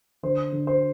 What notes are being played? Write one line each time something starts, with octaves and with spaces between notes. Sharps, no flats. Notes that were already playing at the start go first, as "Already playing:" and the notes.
D3 C5
D3
C5